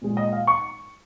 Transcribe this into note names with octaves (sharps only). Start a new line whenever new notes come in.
A#2 G#3
D#5
F5
C#6